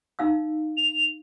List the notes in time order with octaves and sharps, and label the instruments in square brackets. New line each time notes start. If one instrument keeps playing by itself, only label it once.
[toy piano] D#4 F5 E6
[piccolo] F7